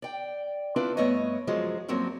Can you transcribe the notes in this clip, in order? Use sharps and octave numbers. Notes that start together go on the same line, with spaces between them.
D5 G5
C4 D4 E4 F4 B4
G2 A3 B3 C#5 D#5
F#2 F3 F#3 G#3
G2 F3 F#3 A#3 C4 C#4